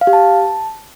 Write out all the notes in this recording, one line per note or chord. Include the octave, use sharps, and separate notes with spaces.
F5
G4
A5